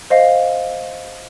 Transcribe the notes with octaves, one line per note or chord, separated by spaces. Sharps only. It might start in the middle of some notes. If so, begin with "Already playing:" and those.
C5 D#5 F5